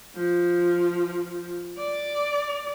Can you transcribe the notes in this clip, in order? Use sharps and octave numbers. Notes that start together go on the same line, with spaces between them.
F3
D5